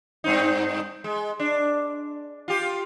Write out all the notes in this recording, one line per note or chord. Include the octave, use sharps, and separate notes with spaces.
G2 C4 D#4
G#3
D4
F4 G4